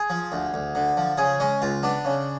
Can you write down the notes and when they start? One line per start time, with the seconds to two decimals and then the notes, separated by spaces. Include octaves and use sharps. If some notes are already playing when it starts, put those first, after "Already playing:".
Already playing: G#4
0.10 F3
0.32 D2
0.54 D2
0.75 D3
0.97 F3
1.18 C#3 G#4
1.40 G#3 C#4
1.62 C#2 F4
1.83 B3 D4
2.05 C#3